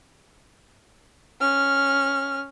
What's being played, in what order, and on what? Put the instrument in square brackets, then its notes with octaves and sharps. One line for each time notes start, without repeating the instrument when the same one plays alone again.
[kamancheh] C#4 F6